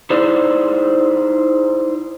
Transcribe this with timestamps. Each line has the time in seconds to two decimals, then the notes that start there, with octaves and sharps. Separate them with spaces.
0.10 D#4 E4 G#4 C5 D5